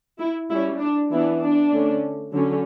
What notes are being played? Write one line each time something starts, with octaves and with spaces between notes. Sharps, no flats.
E4
G3 C#4 E4
D4
E3 B3 D4 E4
D4
D3 A3 C#4
D3 F#3 C#4